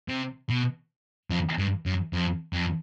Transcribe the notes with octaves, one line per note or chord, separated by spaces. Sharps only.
C3
B2
F2
G2
F#2
F2
F2